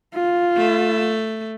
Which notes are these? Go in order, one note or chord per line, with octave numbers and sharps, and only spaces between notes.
F4
A3